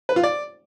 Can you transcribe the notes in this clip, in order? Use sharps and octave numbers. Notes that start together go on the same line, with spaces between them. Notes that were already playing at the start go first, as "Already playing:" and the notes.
B4
F4
D5